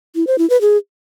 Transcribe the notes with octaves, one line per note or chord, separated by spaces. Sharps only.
E4
C5
E4
B4
G#4